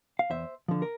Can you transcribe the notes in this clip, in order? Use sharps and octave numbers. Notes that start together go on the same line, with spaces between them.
F5
E2 C5 E5
D3 F3
A#4